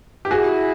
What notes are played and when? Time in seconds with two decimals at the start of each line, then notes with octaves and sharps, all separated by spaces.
0.25 G4
0.31 E4 F#4 G#4